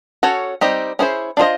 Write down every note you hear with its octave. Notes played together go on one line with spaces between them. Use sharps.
C#4 F#4 A4 C#5
G3 C4 D#4 G4
C#4 E4 G#4 C5
D4 F4 G#4 C5 D#5